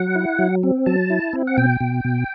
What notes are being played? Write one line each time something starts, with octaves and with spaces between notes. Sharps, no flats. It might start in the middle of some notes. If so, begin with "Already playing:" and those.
Already playing: F#3 F#5
E4
F#3
C4
F#3 A5
E4
C4
F#5
B2 G5
B2
B2